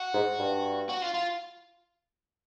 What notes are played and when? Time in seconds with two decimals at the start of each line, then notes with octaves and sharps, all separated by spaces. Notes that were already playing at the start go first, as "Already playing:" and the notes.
Already playing: F#4
0.13 G#2
0.39 G2
0.89 F#4
1.02 F4
1.14 F4